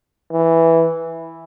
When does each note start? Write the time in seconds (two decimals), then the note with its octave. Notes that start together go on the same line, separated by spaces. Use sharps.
0.32 E3